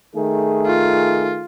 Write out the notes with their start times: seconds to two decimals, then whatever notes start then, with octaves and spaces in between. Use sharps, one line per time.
0.15 D#3 A3 G#4
0.66 F4